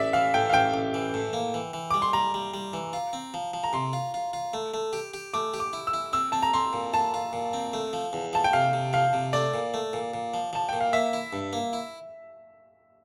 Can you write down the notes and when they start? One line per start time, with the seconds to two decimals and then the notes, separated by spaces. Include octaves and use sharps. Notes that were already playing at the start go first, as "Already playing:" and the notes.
Already playing: A1 D5 E5
0.13 E3 F5
0.34 A2 G5
0.50 F5
0.53 A1 G5
0.74 A1
0.94 E3
1.14 A2
1.33 A#3
1.54 E3
1.73 E3
1.91 G3 D6
2.02 C6
2.13 G3 A#5
2.34 G3
2.54 G3
2.73 E3
2.93 F4
3.13 C4
3.34 F3
3.53 F3
3.64 A#5
3.73 C3 C6
3.93 F4
4.14 F4
4.33 F4
4.53 A3
4.74 A3
4.93 G4
5.14 G4
5.34 A3 D6
5.54 G4
5.60 D6
5.73 E4
5.87 E6
5.94 E4
6.13 C4 E6
6.32 C4 A5
6.42 A#5
6.53 C4 C6
6.73 A#2
6.94 F4 A5
7.14 F4
7.33 A#2
7.53 C4
7.73 A3
7.93 F3
8.13 E2
8.33 F3 A5
8.44 G5
8.53 C3 F5
8.73 C3
8.93 F3 F5
9.13 C3
9.33 A3 D5
9.54 A#2
9.74 A3
9.93 A#2
10.14 A#2
10.34 F3
10.53 F3 A5
10.69 A#2 G5
10.81 F5
10.93 A#3 E5
11.13 E4
11.33 G2
11.53 A#3
11.73 E4